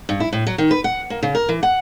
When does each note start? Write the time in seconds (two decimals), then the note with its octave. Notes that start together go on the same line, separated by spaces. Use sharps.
0.09 G2
0.20 E4
0.33 A2
0.47 F#3
0.58 D#3
0.71 B4
0.84 F#5
1.10 A#3
1.23 C#3
1.35 A#4
1.49 E3
1.63 F#5